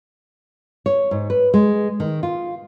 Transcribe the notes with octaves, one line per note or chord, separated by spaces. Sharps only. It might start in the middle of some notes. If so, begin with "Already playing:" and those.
C#5
G#2
B4
G#3
D#3
F4